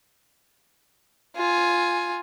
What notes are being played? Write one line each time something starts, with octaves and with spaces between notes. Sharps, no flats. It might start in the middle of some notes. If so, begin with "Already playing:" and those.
F4 G#5